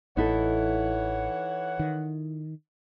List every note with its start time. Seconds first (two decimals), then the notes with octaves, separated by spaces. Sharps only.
0.17 A1 E3 D#4 E4 A4 C#5 F#5
1.79 D#3